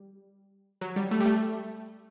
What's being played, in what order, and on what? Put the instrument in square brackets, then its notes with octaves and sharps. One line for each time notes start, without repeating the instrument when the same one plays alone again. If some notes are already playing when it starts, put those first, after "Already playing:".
Already playing: [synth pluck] G3
F#3
G3
A3
G3
A3